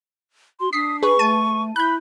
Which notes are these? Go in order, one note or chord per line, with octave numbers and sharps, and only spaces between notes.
F#4 C6
D4 D#6 B6 C7
G#4 B4 C#6
A3 A5 D#7
E4 B5 F#6 G6